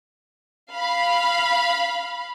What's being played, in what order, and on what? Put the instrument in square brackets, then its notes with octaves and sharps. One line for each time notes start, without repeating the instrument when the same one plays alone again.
[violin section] F5 B5